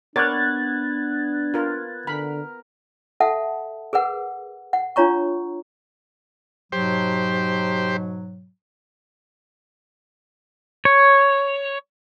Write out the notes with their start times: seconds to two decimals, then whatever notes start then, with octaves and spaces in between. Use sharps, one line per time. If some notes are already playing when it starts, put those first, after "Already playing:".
0.16 B3 D4 A#4 C#5 D5 F#6 G#6 A6
1.54 F4 A#4
2.07 D3 A#4 B5
3.20 A4 E5 F#5 A5
3.93 G#4 A#4 B4 F#5
4.73 F#5
4.96 D4 F4 C#5 A#5 C#6
6.72 G#2 B2 F#3 G4 C5
10.85 C#5